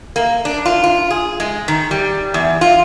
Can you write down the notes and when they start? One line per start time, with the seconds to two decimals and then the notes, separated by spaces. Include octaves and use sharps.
0.16 A#3
0.45 D4
0.66 F4
0.84 F4
1.10 G#4
1.40 G#3
1.68 D#3
1.91 G3
2.34 E2
2.61 F4